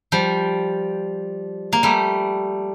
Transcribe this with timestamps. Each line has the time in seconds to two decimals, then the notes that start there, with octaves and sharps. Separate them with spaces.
0.12 F3 G3
1.73 A#3
1.83 G3 A3